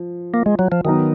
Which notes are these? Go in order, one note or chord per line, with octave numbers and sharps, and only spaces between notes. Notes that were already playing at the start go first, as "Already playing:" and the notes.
Already playing: F3
A#3
G#3
F#3
F3
D#3 F#3 B3 D#4 A#4